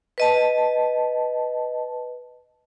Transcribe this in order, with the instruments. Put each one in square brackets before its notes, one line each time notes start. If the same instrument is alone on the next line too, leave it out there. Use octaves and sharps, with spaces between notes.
[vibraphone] B4 D#5 A5